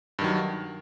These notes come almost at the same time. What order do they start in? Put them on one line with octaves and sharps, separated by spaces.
G2 D#3 F#3